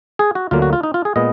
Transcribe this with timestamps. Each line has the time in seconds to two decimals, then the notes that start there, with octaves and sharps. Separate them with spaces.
0.19 G#4
0.35 F#4
0.51 D2 D3 F#3 A#3 F4
0.62 F#4
0.73 F4
0.83 D#4
0.94 F4
1.05 G#4
1.16 A#2 G#3 B3 D#5